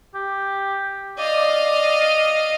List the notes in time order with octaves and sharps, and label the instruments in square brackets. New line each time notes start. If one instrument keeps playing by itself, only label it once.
[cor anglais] G4
[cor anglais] D5 [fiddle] D#5 F5